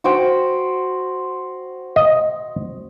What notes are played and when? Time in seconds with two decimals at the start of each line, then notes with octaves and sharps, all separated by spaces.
0.04 F#4 C5 G5
1.96 D#5